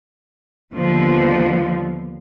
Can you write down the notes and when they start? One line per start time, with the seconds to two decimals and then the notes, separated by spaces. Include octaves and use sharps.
0.73 D#2 D3 F3 G3 B3